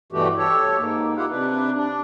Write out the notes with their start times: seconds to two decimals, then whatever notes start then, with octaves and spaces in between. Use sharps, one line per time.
0.12 G2 B2 E3 A3 F#4 G4
0.38 G4 A4 C#5
0.78 G#2 A#3
1.17 A#3 E4 F4 G4 F5 F#5
1.31 C3 D4 B4
1.75 D4